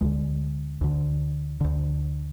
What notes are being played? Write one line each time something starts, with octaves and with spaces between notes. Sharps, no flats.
D2 D3 G#3
D2 D3
D2 D3